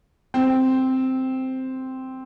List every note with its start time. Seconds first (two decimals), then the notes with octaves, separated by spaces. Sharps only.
0.34 C4